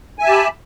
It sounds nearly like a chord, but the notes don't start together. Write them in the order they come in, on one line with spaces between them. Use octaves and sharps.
G#5 E5 A5 G4 B5